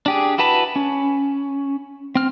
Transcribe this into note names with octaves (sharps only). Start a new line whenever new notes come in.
D4 G4 G#4
E4 F#4 B4 A5 B5
C#4
C4 F6